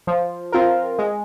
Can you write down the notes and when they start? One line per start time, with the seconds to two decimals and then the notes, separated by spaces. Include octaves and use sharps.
0.07 F3
0.52 C4 F4 A#4
0.99 G#3